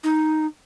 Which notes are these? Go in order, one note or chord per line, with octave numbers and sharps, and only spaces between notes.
D#4